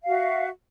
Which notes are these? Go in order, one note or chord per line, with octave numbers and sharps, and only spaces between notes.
F#4 E5 F5